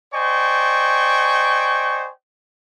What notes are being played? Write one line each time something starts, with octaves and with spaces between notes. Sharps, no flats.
C5 D5 D#5 G5 G#5 C#6